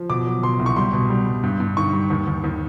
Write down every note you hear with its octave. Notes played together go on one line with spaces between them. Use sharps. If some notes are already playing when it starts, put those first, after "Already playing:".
Already playing: F3
B2 D6
F#3
B2 C6
C2
C#6
G3 C6
B2
G3
G3
G2
G2
D#3 C#6
G3
D#2
D#2
D#2